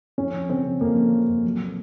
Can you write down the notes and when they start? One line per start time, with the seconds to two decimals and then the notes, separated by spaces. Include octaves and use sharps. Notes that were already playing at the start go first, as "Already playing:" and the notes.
0.18 F2 C#4
0.34 F2
0.50 C#3 C4
0.66 C#3
0.81 F2 A#3
0.97 C#3
1.12 C#3
1.29 F2
1.44 F#3
1.59 A#2